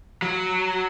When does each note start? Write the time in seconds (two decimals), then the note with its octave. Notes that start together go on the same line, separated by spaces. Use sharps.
0.22 F#3